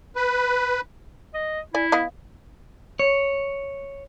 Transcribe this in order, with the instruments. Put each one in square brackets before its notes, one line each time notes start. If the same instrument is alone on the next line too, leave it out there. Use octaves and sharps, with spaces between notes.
[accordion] B4
[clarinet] D#5
[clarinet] E4 [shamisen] D5 G#5
[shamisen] B3 D#5 F5
[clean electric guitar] C#5